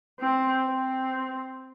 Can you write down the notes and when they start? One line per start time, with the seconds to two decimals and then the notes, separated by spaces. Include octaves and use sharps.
0.20 C4
0.67 C4